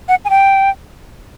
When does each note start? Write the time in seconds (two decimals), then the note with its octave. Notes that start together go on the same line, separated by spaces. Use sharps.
0.09 F#5
0.25 G#5
0.30 G5